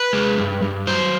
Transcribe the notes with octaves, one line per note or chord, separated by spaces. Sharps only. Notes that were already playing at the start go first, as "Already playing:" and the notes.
Already playing: B4
G#3
G2
G2
F#3 C5